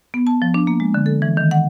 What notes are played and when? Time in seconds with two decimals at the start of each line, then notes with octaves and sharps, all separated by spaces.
0.14 B3
0.27 A5
0.42 F3
0.54 D4
0.67 A#3
0.80 G#3
0.94 D3
1.06 A4
1.22 E3
1.37 D#3
1.51 F#5